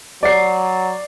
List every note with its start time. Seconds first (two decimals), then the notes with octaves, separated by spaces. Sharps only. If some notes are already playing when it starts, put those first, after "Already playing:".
0.23 F#3 D5 C7